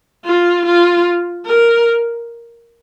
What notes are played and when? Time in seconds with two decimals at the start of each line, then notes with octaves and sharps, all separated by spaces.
0.25 F4
0.65 F4
1.46 A#4